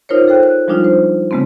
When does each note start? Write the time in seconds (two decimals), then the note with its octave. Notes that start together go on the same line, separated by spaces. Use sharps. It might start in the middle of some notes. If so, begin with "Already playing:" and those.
0.09 D#4 F4 A#4 C5 C#5
0.28 A4 C5 G5 F#6
0.43 F#6
0.68 F3 G3 G#3 D4 D#4 F4
0.84 C5
1.31 C#3 G#3 A3 B3 C4